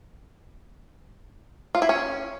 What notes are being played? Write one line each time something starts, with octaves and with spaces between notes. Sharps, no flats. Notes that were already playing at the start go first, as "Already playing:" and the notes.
F4
E4
C#4